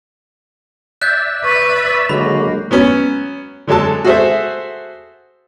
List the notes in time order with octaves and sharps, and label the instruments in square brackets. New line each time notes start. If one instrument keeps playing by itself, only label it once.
[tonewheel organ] D5 E5 E6 [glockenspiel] F#6 G6
[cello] B4 [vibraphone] C#6
[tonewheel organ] D3 F#3 G#3 [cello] A#3 [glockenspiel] B5
[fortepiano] F#3 B3 C#4
D3 F#3 G#3 A4 A5
F#4 G#4 A4 C5 E5